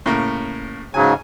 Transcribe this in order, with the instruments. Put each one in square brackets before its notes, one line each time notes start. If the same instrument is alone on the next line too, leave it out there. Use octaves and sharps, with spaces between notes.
[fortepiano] A2 C#3 A#3
[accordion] G#2 C#3 F#3 [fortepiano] G#5